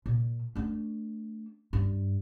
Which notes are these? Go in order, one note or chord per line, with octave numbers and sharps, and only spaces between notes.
A#2
A3 D4
G2